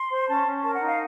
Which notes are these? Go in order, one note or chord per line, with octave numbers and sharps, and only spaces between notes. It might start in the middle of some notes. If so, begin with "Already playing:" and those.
Already playing: C6
C5
C#4 A5
C#4
A#4 A5
F#5
D#4
F5